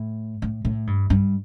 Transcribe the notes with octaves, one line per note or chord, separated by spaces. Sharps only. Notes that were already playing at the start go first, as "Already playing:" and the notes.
Already playing: A2
A2
A2
G2
G2